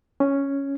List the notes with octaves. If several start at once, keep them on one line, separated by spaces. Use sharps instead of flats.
C#4